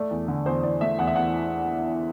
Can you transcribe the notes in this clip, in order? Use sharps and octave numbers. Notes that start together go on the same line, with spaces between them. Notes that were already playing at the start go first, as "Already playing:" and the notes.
Already playing: A3 D5
E2
D3
E2 C5
E2 D5
A3 E5
E2 F#5
E5
E2 F#5